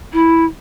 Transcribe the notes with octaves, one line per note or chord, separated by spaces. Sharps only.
E4